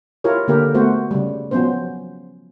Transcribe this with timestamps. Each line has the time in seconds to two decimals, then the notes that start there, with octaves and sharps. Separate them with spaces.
0.24 E4 F4 G4 A#4 C#5
0.48 D3 A#3 G4 A#4
0.74 A3 B3 F#4 C5
1.11 C#3 G3
1.51 F3 F#3 B3 C#4 C5